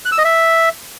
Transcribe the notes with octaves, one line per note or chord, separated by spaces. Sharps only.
F#6
E6
D#5
E5